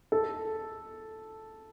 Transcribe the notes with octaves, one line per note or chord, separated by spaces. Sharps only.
A4